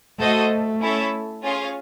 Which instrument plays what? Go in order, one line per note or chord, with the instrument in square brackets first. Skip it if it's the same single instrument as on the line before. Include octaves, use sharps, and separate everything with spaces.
[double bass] A3 [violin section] F#4 A4 C5 D#5
[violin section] C#4 E4 A4 C#5 E5
C#4 F4 G#4 C#5 F5